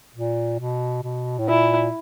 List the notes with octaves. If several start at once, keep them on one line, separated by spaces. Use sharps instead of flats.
A#2
B2
B2
A2
A#2 E4